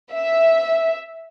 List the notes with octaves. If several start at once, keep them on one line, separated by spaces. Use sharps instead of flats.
E5